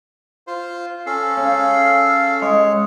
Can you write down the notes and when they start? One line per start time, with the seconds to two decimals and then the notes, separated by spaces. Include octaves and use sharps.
0.47 F4 C5
1.06 C#4 A4 F5
1.37 C#3
2.42 G#3 C#5